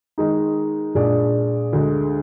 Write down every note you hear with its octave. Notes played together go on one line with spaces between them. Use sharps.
D#3 G#3 D#4
A#2 G#3 D4 G#4 D5
D2 D3 G#3